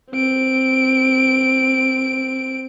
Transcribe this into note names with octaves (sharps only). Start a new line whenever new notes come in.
C4 D7